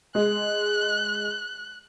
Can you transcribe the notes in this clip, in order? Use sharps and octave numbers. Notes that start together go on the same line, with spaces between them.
G#3 F#6